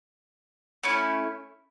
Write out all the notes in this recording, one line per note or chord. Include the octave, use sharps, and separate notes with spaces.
A3 C#4 E4